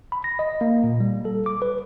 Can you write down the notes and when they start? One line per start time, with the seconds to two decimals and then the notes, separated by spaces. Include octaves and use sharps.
0.12 B5
0.24 A#6
0.39 D#5
0.61 A#3
0.84 A#2
1.00 G3
1.25 A4
1.46 D6
1.62 B4